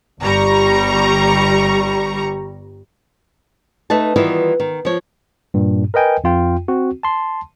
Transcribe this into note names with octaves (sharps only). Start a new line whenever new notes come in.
G1 G3 A#5 C#6
A3 D#4 B4 A5
D#3 E3 G3 B3 E4 F4
D#3
F3 C#5
G2 A#2
A#4 B4 D#5 G5 G#5
F2 F4 G5
C4 F#4
A5 C6